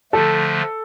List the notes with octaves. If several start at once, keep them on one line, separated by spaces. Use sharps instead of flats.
D3 F3 A3 A4